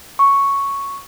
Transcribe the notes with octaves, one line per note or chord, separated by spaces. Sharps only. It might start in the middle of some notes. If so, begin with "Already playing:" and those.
C#6